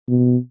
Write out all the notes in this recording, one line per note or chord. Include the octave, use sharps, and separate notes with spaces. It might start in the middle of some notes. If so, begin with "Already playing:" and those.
B2